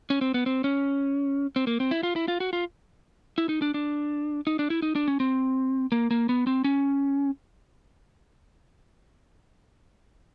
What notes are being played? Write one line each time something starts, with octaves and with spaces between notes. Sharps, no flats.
C#4
C4
B3
C4
C#4
C4
A#3
C4
E4
F4
E4
F4
F#4
F4
E4
D#4
D4
D4
D#4
D4
E4
D#4
D4
C#4
C4
A#3
A#3
B3
C4
C#4